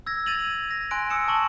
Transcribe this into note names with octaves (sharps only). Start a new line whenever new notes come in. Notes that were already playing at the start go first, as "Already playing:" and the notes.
E6 G#6 A#6
G#6 A6 D#7 F7 F#7
A#6
G#5 C6 F#6 D7
D#6 E6 C#7 E7
A5 C#6 F#7